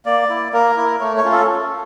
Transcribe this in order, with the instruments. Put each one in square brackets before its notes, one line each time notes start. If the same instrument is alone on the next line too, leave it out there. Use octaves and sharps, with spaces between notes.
[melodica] A#3 D5
E4
A#3 A#4
E4
A3 C#5
C#5
C#4 F4
A4